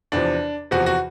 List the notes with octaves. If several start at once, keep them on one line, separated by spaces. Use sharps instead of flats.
E2 C3 F3 D4
E2 C3 F3 F#4
F#4